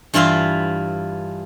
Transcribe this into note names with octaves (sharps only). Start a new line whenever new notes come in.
G2 E3 E4 F4 E5 C6